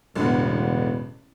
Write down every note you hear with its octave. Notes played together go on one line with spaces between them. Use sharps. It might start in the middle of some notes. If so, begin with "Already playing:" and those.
E1 A1 D3 B3